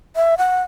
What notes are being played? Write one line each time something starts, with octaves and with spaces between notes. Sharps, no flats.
E5
F#5